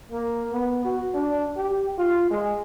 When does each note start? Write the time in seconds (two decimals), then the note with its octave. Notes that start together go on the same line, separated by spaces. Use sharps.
0.12 A#3
0.52 B3
0.85 F#4
1.14 D4
1.57 G4
1.98 F4
2.31 G#3